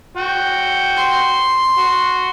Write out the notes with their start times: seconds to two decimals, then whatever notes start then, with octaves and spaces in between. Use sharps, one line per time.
0.17 F#4 G5
0.96 C6
1.78 F#4